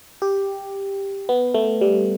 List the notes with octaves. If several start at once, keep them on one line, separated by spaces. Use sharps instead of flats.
G4
B3
A3
G3